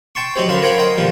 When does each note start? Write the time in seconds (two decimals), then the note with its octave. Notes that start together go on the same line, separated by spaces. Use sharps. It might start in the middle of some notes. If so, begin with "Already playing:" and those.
0.15 G5 A5 C6 C#6
0.36 F#3 D#4 E4 G4 C5
0.48 F#2 D3 F#4 F5 B5 C6
0.62 A#4 C5 C#5 F5 G5 B5
0.78 A#4 D#5 G5 C6
0.97 A#2 D3 F3 G3